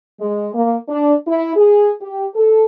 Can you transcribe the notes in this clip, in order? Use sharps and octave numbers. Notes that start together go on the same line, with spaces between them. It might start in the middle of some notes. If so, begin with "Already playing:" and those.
G#3
A#3
D4
E4
G#4
G4
A4